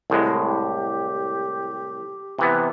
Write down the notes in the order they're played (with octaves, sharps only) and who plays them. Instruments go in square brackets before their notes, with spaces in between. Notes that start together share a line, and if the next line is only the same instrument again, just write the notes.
[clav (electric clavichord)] C2 A2 G#3
[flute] G4
[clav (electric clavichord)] C3 E3 B3